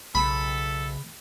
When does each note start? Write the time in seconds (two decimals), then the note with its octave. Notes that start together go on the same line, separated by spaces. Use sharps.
0.15 B1 C#3 A4 B5